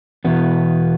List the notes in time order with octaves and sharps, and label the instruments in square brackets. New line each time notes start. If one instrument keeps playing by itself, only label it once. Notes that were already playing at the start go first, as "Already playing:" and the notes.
[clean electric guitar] E2 B2 B3